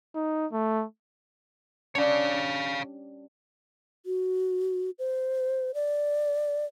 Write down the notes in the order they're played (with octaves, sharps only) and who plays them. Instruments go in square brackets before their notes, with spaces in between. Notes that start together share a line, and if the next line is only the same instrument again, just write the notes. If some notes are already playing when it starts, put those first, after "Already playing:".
[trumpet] D#4
A3
[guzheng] G3 C#4 D4 [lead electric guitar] C#5 F5
[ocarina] F#4
C5
D5